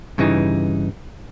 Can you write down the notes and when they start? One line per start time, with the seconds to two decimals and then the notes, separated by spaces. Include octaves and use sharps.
0.18 G2 C#3 E3 D#4